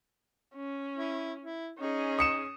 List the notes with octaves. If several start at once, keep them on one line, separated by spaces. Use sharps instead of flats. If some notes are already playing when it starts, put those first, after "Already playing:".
C#4
E4
E4
C#4 D#4 G#4
D#6 C#7 E7